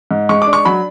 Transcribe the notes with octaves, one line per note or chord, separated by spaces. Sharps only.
G#2
G#3 C#6
D4 D6
C#6
F#3 B5